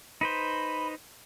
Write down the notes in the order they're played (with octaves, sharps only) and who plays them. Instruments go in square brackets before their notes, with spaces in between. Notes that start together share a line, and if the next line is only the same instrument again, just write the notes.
[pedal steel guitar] D#4 B4 C5 [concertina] B5